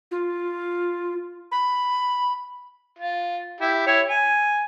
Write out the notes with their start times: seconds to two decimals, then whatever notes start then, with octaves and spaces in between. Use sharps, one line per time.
0.11 F4
1.52 B5
2.99 F4
3.61 E4 G4
3.87 E4 C#5
4.09 G#5